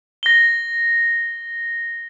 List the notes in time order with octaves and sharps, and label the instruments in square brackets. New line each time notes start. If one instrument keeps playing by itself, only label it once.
[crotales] A#6 G7